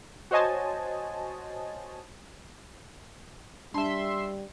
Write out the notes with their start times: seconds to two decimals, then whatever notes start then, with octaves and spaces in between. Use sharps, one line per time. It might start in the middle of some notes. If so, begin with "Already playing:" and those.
0.31 F#4 C5 C#5 D#5 G#5 A5
3.74 G3 D4 E5 A5 C6